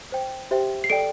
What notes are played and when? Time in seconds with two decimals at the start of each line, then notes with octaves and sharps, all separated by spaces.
0.12 C5 G5
0.51 G4 C5 E5 G5
0.84 C7
0.90 A4 D5 G5 D7